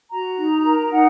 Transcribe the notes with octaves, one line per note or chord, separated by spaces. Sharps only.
F#4 A#5
D#4
A#4
D#4 F#5